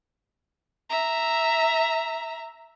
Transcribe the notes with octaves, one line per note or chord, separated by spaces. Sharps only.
E5 A#5